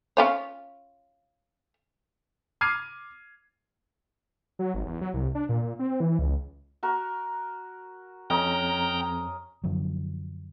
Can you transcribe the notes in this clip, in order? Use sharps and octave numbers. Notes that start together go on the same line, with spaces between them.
C#4 F4 C#5
D6 F6 G#6 C7 D#7
F#3
G#1
E2
F#3
C2
D4
A#2
A#2
C4
E3
C#2
F#4 A#4
F2 C#4 A#4 D#5 G5 A#5
F#2 D3 F3 F#3